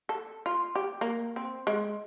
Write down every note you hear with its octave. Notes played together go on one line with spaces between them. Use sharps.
A4
F4
G4
A#3
C4
G#3